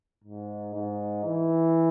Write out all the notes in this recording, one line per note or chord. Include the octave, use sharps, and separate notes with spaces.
G#2
G#2
E3